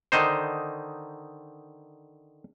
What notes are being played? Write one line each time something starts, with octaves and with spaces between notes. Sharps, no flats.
D3 D#3 D#4 C5